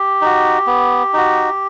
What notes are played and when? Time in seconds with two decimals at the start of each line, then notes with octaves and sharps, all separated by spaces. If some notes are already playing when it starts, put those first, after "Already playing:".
Already playing: G4
0.21 D#4 F#4
0.67 B3
1.13 D#4 F#4